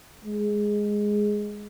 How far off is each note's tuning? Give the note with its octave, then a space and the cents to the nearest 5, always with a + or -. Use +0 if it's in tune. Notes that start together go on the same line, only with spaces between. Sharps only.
G#3 +0